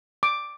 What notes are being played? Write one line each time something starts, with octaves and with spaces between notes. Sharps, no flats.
D6